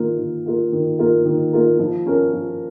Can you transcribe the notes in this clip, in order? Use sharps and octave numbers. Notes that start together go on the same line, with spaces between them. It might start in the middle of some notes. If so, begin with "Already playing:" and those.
Already playing: D#3 A#3 F4 A#4
D#3
A#3 F4 A#4
D#3
A#3 F4 A#4
D#3
A#3 F4 A#4
F3
C#4 A#4
F3